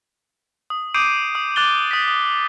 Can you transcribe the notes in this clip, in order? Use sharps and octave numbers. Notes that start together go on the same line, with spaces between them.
D#6
D6 D#6 G6 C7 D7 D#7
D#6
D6 F#6 A6 G7
D#6 B6
D#6